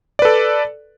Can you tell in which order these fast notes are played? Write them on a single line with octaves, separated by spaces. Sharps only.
D5 B4 A4